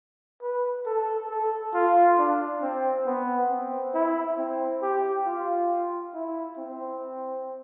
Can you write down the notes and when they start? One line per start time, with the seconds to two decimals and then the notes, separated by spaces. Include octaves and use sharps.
0.42 B4
0.86 A4
1.30 A4
1.74 F4
2.18 D4
2.62 C4
3.06 B3
3.50 C4
3.95 E4
4.38 C4
4.82 G4
5.26 F4
6.14 E4
6.58 C4